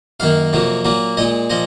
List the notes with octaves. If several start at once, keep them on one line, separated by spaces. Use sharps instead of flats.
F#2 D#3 A#3 F5
F2 C3 F#3 A#3
A#2 F#3 A#3
A#2 G#3 D#5
A#2 F3 D#5